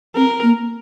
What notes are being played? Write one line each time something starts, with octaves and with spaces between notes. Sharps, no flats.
C4 A#4
A#3